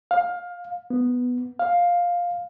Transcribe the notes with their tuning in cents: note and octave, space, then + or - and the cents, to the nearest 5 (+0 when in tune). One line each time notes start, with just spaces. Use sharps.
F5 +15
B3 +0
F5 +5